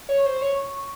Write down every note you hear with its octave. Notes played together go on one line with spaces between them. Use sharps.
C#5
C#6
C5
C#5